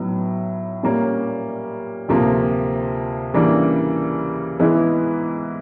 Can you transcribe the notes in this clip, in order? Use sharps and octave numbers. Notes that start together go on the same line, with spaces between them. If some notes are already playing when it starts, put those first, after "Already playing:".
Already playing: A2 F#3 B3 D#4
A#2 G3 A#3 C#4
D2 C3 F3 A#3
C#3 E3 G3 A#3 D4
G#2 E3 G#3 B3 E4